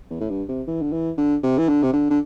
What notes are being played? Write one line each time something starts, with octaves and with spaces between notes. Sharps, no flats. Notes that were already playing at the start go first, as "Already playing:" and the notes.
E2
A2
G2
C3
E3
D3
E3
D3
C3
E3
D3
C3
D3
D3